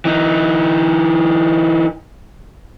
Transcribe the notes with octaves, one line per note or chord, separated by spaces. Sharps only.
E3 D#4